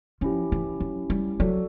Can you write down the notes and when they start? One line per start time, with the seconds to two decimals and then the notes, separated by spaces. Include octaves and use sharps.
0.21 F3 C#4 E4 G4
0.52 E3
0.80 F#3
1.10 G3
1.40 F#3 F#4 A4 D5